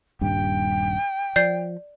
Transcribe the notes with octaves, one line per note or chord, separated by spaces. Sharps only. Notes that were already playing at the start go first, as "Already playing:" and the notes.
D#1 G2 G5
F3 D5 G6 C7